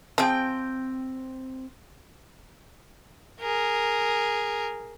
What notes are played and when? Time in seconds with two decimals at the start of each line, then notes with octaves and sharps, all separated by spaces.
0.18 F3 C4 G#4 G5
3.41 G#4 A#4